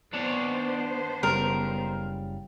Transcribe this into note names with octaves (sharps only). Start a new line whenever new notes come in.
D#3 B3 D4 C5 C#5
F#1 C#3 G3 A#4